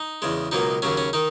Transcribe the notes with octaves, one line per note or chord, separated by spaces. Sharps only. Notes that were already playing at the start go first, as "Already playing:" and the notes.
Already playing: D#4
E2 C#3 G#3
C#2 B2 F#3 A#3 D#4
D#2 C#3 F#3 C#4
C#4
D#3 D#4